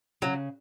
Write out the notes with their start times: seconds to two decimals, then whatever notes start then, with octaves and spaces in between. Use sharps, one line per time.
0.22 C#3 F#3